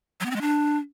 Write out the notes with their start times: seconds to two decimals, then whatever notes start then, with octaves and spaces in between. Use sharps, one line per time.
0.20 F#3
0.26 B3
0.31 C4
0.36 G#3
0.41 D4